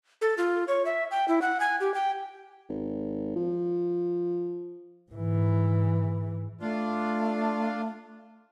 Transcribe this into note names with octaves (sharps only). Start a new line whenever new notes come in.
A4
F4
C#5
E5
G5
E4
F#5
G#5
G4
G5
G#1
F3
G#2 E3
A3 D4 F4